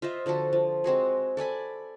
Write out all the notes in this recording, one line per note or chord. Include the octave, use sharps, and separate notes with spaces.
F4 C5 D#5 E5
D3 F3 F#4 A4
F3
G#3 C4 F#4 G#4
A4 D5 G#5 B5